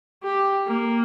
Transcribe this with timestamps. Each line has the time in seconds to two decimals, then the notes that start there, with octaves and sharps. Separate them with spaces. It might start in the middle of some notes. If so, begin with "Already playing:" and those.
0.23 G4
0.66 A#3